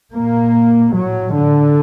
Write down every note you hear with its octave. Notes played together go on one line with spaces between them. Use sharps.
A#2 A#3
A2 F#3
D3